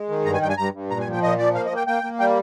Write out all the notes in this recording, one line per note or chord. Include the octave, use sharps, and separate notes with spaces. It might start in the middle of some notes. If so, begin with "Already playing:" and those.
Already playing: G#3
D#3
G2 A#5
G#5
G2 G5
G#5
G2 A#5
G2
A#2 A#5
G#5
F3
G5
A#2 D#5
F3 D5
A#3 F5
D#5
A#3
G5
A#3 G5
A#3
G3 G5